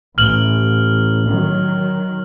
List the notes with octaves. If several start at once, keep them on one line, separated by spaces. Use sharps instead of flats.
A1 F6 F#7
D#3 F#3